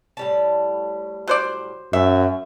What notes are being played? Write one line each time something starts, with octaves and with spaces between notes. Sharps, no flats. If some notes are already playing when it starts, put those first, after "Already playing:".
A2 G3 A5
F#3 C5 D5
F#2 E5